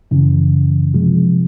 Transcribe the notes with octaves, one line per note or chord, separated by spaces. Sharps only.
F#2 C#3 E3
C3 F3 G#3